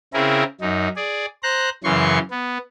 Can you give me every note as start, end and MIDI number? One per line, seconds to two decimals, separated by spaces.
0.13 0.43 49
0.13 0.43 60
0.13 0.43 64
0.13 0.43 68
0.13 0.43 70
0.61 0.88 42
0.61 0.88 63
0.96 1.26 68
0.96 1.26 74
1.43 1.70 72
1.43 1.70 82
1.43 1.70 90
1.84 2.18 42
1.84 2.18 49
1.84 2.18 52
1.84 2.18 84
1.84 2.18 85
2.31 2.58 59